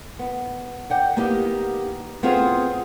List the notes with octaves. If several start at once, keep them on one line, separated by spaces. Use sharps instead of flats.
B3
D5 F#5 G5
A#3 B3 D#4 G4
B3 C4 F4 G#4 A4